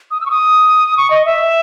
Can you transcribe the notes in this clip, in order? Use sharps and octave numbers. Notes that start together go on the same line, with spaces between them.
D#6
E6
C#6
D#6
C#6
D#5
E5